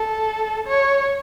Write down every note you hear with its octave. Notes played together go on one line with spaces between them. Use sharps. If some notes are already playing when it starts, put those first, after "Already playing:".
Already playing: A4
C#5